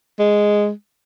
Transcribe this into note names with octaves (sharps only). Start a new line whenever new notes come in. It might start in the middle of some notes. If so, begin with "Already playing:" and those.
G#3